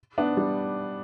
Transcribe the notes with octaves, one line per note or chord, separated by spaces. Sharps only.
B3 D4
G3